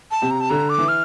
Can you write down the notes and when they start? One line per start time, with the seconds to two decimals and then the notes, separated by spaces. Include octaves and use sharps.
0.11 A5
0.22 C3
0.31 A#5
0.41 A5
0.50 D3 A#5
0.69 D6
0.78 E3
0.88 F6